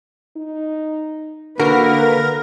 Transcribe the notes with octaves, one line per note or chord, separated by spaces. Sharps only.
D#4
D3 A#3 F#4 A#4 B4